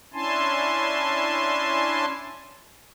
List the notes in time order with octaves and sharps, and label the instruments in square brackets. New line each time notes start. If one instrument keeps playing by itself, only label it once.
[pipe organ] C#4 D4 E4 G#5 A5 C6